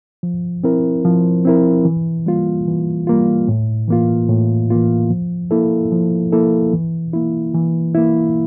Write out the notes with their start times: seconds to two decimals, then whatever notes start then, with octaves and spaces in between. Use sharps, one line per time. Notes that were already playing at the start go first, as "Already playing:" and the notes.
0.23 F3
0.64 C4 E4 A#4
1.05 F3
1.45 C4 E4 A#4
1.85 E3
2.26 G3 A#3 F4
2.67 E3
3.07 G3 A#3 F4
3.48 A2
3.88 E3 A#3 F4
4.29 A2
4.70 E3 A#3 F4
5.10 F3
5.51 A#3 E4 A4
5.92 F3
6.33 A#3 E4 A4
6.73 E3
7.13 A#3 E4
7.54 E3
7.95 A#3 E4